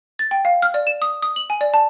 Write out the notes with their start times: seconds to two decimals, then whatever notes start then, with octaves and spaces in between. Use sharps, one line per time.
0.19 A6
0.31 G5
0.45 F5
0.62 F6
0.74 D5
0.87 E7
1.02 D#6
1.22 D#6
1.36 F#7
1.50 G#5
1.61 D5
1.74 A5